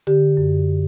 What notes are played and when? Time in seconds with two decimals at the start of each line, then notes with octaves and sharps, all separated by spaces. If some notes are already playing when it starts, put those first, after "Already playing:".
0.07 D3 G4
0.37 F#2